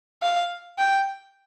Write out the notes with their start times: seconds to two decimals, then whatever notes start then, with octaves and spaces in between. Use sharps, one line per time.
0.22 F5
0.78 G5